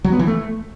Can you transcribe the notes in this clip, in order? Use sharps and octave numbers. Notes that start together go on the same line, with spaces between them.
F#3
B3
E3
A3